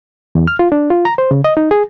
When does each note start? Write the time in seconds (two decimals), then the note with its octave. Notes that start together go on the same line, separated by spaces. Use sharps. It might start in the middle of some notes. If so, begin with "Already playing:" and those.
0.35 E2
0.47 F6
0.59 F4
0.72 D4
0.90 F4
1.05 A#5
1.18 C5
1.31 C#3
1.44 D#5
1.57 D#4
1.71 G#4